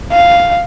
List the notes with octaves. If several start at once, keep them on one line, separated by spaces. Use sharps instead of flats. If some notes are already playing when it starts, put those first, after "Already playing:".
F5